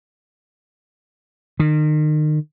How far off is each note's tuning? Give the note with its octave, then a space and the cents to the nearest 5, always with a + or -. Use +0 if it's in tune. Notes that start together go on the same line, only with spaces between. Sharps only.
D#3 -35